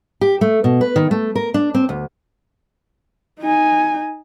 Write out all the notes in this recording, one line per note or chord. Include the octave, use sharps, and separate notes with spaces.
G4
A3
B2
B4
D#3
A3
A#4
D4
C4
D2
D#4 G#5